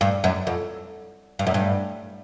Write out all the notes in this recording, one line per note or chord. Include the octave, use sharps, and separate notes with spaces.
G2
F#2
F2
G2
F#2
G2